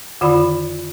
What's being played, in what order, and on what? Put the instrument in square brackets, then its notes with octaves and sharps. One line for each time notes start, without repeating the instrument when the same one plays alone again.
[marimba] F2 D3 D#3 F4 D5 B5